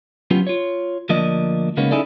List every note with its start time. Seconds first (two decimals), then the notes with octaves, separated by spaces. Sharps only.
0.31 F#3 B3 C#4 F4 G4
0.47 F4 C#5
1.09 D2 F3 A#3 D4 D#5
1.77 C#3 G#3 A#3 B3 C#4 D#4
1.91 C#4 D#4 E4 G#4 A4 D5